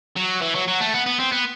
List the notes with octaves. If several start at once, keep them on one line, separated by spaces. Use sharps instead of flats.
F#3
E3
F#3
F#3
A3
B3
B3
C4
B3